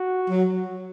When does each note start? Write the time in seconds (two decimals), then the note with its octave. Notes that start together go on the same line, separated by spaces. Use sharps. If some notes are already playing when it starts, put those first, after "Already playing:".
Already playing: F#4
0.30 F#3